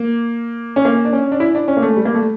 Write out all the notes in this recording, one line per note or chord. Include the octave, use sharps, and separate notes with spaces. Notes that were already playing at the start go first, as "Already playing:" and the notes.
Already playing: A#3
C#4
A#3
D4
C#4
D4
E4
D4
C#4
A#3
A3
G3
A#3
A3